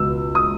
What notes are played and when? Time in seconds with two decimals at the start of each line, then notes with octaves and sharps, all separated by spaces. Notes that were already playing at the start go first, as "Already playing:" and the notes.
Already playing: C#2 B2 E6
0.35 D#6